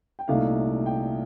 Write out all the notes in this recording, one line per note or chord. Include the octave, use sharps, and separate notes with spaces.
G5
C2 A#2 A3 D#4 F5
G5